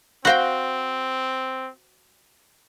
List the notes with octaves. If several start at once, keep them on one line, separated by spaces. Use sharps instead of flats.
C4 F#4 C5 F5 G5 A#6 F#7